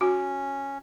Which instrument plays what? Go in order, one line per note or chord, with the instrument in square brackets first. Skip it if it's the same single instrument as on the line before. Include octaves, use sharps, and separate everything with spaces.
[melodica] C#4 [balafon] F#4